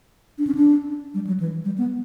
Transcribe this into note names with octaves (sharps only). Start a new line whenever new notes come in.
D4
C#4
D4
G3
F#3
E3
G3
B3